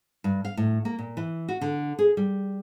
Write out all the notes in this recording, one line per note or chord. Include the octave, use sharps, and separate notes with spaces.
G2
F5
A2
A#3
A#2
E3
F#4
D3
G#4
G3